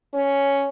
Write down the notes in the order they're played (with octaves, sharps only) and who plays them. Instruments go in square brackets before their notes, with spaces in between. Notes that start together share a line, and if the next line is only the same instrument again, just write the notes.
[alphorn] C#4